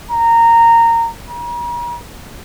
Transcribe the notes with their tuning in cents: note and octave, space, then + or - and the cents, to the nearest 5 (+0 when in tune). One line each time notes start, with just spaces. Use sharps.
A#5 -15
A#5 +40